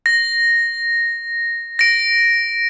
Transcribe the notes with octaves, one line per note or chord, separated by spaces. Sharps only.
A#6
A#6 D7